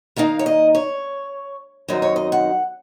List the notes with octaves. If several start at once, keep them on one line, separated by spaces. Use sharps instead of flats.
D#3 A#3 D#4 F5
C#5
D#5
C#5
F#2 D#3 F#3 C4 D#4 D#5
C#5
D#5
F#5